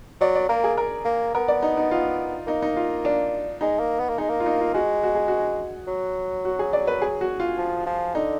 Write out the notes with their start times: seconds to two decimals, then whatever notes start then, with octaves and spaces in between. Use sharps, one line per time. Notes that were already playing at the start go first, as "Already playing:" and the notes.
0.21 F#3 D5
0.35 D5
0.49 A#3 A#4
0.64 G#4
0.78 A#4
1.05 A#3
1.35 B3 A#4
1.48 D5
1.63 D#4
1.77 D#4
1.91 F4
2.47 A#3 D#4
2.62 D#4
2.77 F4
3.05 D4
3.61 G#3 D#4
3.80 A#3
4.00 B3
4.09 A#3
4.18 G#3 D#4
4.30 A#3
4.40 F4
4.46 D#4
4.61 F4
4.74 G#3 F#4
5.03 F#4
5.15 G#4
5.28 F#4
5.87 F#3
6.45 F#4
6.59 G#4
6.73 D5
6.87 B4
7.02 G#4
7.21 F#4
7.40 F4
7.58 F3
7.86 F3
8.15 D3 D#4